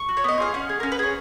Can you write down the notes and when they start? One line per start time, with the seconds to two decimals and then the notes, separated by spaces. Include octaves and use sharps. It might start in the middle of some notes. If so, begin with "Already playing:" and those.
Already playing: C#6
0.09 F#4
0.17 C#5
0.24 B3 D#5
0.38 F4 G#4 F5
0.54 C#4 F#5
0.69 G#4
0.80 C#4 A#4
0.92 B4
0.99 G#4 C#5